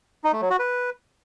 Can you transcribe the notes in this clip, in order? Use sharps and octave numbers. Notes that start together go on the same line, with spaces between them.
D#4
A3
F#3
F#4
B4